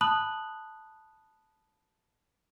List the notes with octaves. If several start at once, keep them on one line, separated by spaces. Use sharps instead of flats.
A5 B5 D#6 F#6 F#7